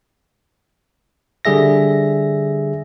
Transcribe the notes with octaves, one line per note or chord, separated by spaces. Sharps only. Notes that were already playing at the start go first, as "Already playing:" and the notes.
D3 G3 G#4 E5 A#6